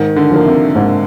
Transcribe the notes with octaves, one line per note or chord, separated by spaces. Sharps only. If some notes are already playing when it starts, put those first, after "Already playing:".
Already playing: G#2 D#3
D3
F3 A#3
C3
G#2